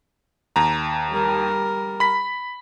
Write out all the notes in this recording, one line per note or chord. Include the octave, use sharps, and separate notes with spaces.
D#2 A#5
G3 A#4
B5 B6